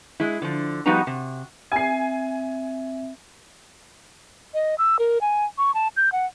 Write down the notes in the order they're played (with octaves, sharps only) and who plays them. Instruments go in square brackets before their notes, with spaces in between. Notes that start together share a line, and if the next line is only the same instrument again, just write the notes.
[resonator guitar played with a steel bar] G#3 E4
D3 F3
F3 G3 B3 D#4 F#4 A#5
C3
[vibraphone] C4 E5 [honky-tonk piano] G#5 C7
[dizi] D#5
E6
A#4
G#5
C#6
A5
G6
F#5